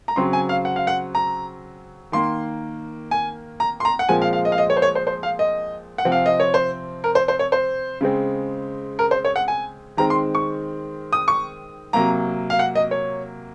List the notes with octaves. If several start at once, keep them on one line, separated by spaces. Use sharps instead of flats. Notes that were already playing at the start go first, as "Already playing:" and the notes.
A#5
C#3 F#3 C4 C6
G#5
F5
F#5
F5
F#5
A#5
D#3 A#3 C6
G#5
A#5
C6
A#5
F#5
A#2 F3 G#3 C4 G#5
F5
F5
D#5
F5
D#5
C#5
C5
C#5
C5
C5
F5
D#5
F#5
C3 F3 C4
F5
D#5
C#5
C5
A#4
C5
C5
C#5
C5
C#3 G#3 C4
A#4
C5
C#5
F#5
G#5
D#3 G#3 C4 A#5
C6
C#6
D#6
C#6
C3 F#3 A#3 A#5
F5
F#5
D#5
C#5